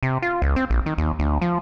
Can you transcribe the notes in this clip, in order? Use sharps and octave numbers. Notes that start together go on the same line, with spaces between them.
C3
F4
C#2
C4
A#1
D#3
D#2
D2
F3